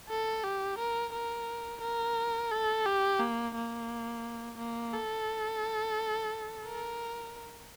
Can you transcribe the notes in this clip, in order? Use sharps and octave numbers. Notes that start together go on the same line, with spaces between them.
A4
G4
A#4
A#4
A#4
A4
G4
A#3
A#3
A#3
A4
A#4